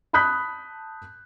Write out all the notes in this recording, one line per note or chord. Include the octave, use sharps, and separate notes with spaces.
A5 B5 D#6 F#6 G6 B6